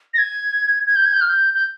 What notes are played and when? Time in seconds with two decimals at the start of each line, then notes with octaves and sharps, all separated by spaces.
0.14 A#6
0.18 G#6
0.87 G#6
0.96 G6
1.05 G#6
1.13 G6
1.21 F6
1.29 G6
1.54 G6